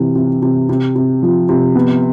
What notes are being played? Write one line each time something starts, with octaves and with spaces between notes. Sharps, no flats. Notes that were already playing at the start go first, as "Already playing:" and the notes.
Already playing: C3 E3
C3
C3
C3
C3
F3
C3
B3